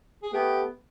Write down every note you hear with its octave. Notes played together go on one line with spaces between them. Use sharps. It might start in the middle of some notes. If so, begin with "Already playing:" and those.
G#4
A3 B3 G4